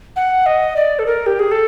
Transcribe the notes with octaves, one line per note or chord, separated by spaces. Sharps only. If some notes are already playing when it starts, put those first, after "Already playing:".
F#5
D#5
D5
A4
A#4
G4
G#4
A4